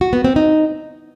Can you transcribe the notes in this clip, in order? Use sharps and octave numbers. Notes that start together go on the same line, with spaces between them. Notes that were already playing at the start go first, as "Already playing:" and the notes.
F#4
B3
C4
D#4